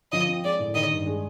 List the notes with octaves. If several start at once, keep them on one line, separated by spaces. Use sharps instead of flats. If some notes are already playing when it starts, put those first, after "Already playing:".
F3 D#5
C4
G#3 D5
A2
D#3 D#5
G2
G#3